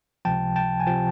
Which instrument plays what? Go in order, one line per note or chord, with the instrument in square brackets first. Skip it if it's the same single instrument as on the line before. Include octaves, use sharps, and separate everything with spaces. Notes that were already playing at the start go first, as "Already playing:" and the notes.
[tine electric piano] C#2 C3 F3 G5 A5
G5 A5
G#5
C3 F3 G5 A5